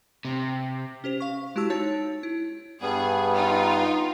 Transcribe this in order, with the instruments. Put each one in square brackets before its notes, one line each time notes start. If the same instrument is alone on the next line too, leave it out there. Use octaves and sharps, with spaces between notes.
[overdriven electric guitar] C3
[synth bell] C#4 G4 C5 F7
F5 C#6
G#3 E4 F#4 G4 A5 E6
D#4 C#5 A5 A6
E4
[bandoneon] G2 G3 B3 [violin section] G#4
[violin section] D#4 F4